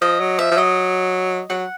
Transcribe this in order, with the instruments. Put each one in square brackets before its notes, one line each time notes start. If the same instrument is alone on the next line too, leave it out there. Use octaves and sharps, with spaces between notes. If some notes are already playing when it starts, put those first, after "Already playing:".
[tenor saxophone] F3 [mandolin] D#5
[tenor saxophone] F#3
[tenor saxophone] F3 [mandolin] E5
[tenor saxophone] F3
[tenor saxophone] F#3 [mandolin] D#5
[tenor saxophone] F#3 [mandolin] F#5